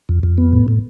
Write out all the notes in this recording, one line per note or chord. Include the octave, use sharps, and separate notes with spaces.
F2
F2
B3
A2
A2